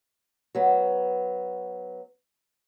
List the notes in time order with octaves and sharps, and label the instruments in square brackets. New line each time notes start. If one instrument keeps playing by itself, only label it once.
[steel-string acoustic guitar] F#3 B3